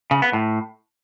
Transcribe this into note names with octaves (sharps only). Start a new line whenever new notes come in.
C#3
B3
A2